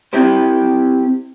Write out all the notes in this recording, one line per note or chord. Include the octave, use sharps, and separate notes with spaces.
C4 E4 G4 C5